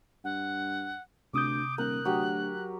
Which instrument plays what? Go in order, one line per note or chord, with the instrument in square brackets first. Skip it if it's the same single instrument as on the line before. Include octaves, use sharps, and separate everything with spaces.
[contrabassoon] G2 [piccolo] F#5
[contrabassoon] D2 [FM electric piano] C3 D#6 G6 [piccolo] D6
[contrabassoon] D#1 [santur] A#4 D6 [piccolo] F#6
[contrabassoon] D2 [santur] F#3 G4